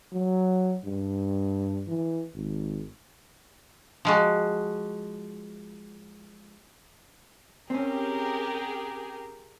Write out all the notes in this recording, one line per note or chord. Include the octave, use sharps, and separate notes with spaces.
F#3
G2
E3
G#1
F3 G#3 F#4
C4 C#4 G4 G#4 A#4